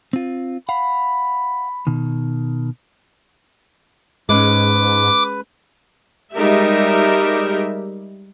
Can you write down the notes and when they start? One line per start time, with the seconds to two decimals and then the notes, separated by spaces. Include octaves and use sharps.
0.13 C4 F4
0.69 F5 F#5 B5
1.87 B2 D#3
4.29 G#2 G#3 C#4 B4 D6
6.34 G3 G#3 D#4 G4 A#4 E5